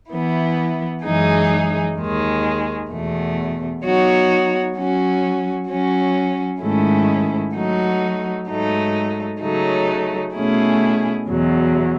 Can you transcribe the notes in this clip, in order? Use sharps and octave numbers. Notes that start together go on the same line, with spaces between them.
E3 B3 E4
F#2 E3 G#3 D#4 G#4
D#2 D#3 G#3
E2 B2 A3
F#3 B3 D#4 F#4 C#5
F#3 C#4 F#4
F#3 C#4 F#4
G#2 D#3 A3 C#4 E4
F#3 A3 D#4 F#4
G#2 F#3 A3 D#4
C#3 F#3 A3 D#4
B2 A3 C#4 E4 G#4
E2 B2 F#3